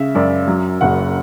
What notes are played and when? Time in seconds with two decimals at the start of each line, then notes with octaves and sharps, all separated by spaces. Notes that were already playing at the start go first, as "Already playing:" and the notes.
Already playing: C#3 E5
0.15 F#2 D5
0.48 F#3
0.81 F#1 F#5